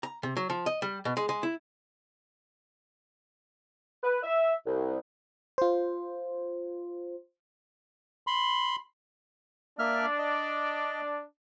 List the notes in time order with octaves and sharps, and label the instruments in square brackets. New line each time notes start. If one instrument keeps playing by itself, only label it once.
[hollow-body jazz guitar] A#5
C3
F#3
F3
D#5
G3
B2
G#3
G#3
E4
[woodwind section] B4
E5
C2
[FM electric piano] F4 C5
[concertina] B5 C6
[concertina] A#3 E5 F6 [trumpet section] D4 D5
[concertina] D#5